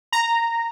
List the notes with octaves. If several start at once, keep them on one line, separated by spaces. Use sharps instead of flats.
A#5